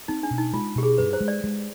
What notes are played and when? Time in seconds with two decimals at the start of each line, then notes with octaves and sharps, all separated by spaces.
0.08 C4 D#4
0.23 D4
0.31 B2
0.38 D#4
0.53 G#3 F4
0.76 B2 G4
0.83 G#4
0.98 G2 B4
1.13 C5
1.20 G#3
1.28 D5
1.44 G#3